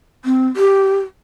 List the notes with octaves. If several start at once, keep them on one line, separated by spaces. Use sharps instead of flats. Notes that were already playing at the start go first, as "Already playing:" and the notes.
C4
G4